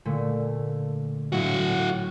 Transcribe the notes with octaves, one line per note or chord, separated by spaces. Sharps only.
A#2 D3 A3
A2 F#3 E4 F#4 D#5